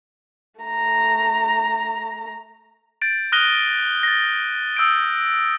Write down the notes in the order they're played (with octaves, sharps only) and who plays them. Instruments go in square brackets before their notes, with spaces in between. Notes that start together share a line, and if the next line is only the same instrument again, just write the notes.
[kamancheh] A3 A#5
[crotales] G6 A6 D7
D#6 F6 F#6 A#6 D#7 G7
A6 A#6
D#6 E6 G6 A6 D7